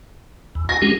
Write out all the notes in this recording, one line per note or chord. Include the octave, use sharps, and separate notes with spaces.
E2
F#5 G#5 A#6
G#3 C#4 G4